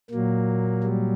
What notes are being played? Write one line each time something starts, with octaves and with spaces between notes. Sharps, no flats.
A#2 F#3 A#3
G3